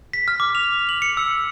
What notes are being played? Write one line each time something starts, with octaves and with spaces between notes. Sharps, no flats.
B6
F6
D6
F7
F#7
C#7
E6